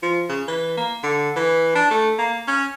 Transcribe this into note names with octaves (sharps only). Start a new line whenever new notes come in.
F3
C#3
E3
A#3
D3
E3
D4
A3
A#3
C#4